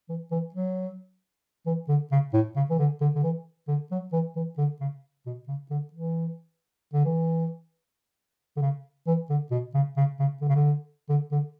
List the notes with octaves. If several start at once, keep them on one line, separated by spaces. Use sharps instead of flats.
E3
E3
F#3
E3
D3
C#3
A2
C#3
E3
D3
D3
D3
E3
D3
F#3
E3
E3
D3
C#3
B2
C#3
D3
E3
D3
E3
D3
C#3
E3
D3
B2
C#3
C#3
C#3
D3
C#3
D3
D3
D3